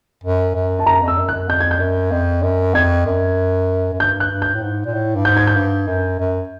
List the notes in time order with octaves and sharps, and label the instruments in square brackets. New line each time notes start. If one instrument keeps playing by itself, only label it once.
[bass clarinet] F#2
F#2
[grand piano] A5
[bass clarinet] F#2 [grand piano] A#5
[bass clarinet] F2
[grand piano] E6
[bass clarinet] F#2
[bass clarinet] F#2 [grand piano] F#6
[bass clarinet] F2 [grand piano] G6
[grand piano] G#6
G6
[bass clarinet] F#2
F2
F#2
[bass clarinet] F2 [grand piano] G#6
[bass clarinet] F#2
F#2
[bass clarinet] G2 [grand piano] G6
[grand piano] F#6
[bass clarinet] G2
[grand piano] G6
[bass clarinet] A2
G#2
A#2
A2
G2
[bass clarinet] G#2 [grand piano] G6
[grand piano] G#6
G6
[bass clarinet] G2
F#2
F#2